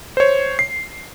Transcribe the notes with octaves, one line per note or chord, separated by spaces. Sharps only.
C5 C#5
C7